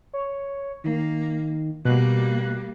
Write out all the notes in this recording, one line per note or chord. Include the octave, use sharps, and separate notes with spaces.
C#5
D#3 A#3
B2 G3 A#3 F#6